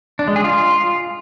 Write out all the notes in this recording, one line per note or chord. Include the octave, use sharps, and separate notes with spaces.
D4
G#3
G#4
F4